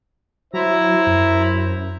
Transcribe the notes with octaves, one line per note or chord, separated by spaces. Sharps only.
F#3 E4 C5 A#5
F#2